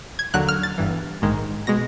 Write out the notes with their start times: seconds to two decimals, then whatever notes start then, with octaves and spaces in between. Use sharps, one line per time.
0.19 G#6
0.34 D#2 D3 F#3 F#6
0.48 F6
0.63 A6
0.78 G1 G2 E3
1.22 A#1 G#2 D#3 G#3
1.67 B2 G#3 A#6